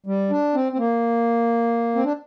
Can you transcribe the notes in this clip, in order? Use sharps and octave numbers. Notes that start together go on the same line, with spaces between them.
G3
D4
C4
C4
A#3
C4
D4